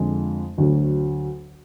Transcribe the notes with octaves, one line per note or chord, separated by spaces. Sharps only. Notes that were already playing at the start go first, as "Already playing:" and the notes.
Already playing: F2 D3 G#3
D2 D3 F#3